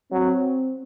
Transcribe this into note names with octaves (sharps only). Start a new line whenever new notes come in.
F#3 C4